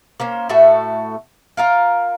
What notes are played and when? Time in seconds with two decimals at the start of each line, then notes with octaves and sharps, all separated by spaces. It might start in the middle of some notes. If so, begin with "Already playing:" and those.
0.20 A#3 C#4 C5
0.49 A2 A3 F#4 A4
1.57 F4 A#4 F5